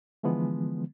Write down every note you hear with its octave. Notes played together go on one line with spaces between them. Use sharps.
D3 E3 F3 G#3 B3